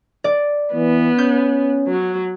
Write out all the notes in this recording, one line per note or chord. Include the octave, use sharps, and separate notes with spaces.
D5
E3 B3
C#4 G6
F#3